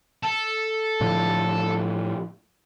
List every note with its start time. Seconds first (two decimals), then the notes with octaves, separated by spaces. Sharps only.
0.23 A4
1.01 A2 D3 F3